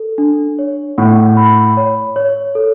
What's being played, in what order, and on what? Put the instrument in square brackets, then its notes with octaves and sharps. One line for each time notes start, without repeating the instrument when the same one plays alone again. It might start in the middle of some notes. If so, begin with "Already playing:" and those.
Already playing: [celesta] A4
D4
C#5
[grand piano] A2 [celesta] F#5
[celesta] B5
C#5
C#5
A4